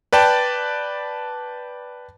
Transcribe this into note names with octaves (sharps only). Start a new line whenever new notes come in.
B4 D5 G5 A5